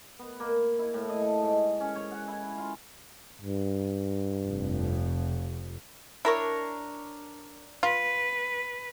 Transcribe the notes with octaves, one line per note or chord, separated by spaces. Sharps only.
B3
A#3
E4
A2
D#5
A4
G#2
C#4
C#5
F#5
E4
F4
G2
F1 F2
D4 E4 A#4 C#5
F4 B4